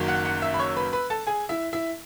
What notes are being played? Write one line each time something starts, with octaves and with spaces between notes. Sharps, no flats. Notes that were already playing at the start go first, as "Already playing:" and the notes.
Already playing: F#1 F#2 D#3
F#5 F#6
F#5 F#6
E5 E6
B5
C#5 C#6
B4 B5
B4 B5
A4 A5
G#4 G#5
E4 E5
E4 E5